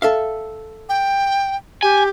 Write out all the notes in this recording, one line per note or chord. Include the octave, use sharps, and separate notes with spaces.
A4 E5 F5
G5
G4 G#5